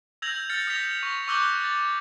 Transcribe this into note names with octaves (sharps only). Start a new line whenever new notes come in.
E6 G6 G#6 A#6 F7 F#7
F6 G6 A6 C#7
D#6 G6 G#6 A#6 B6 F7
C#6
C#6 D6 E6 F#6 G6 G7
A6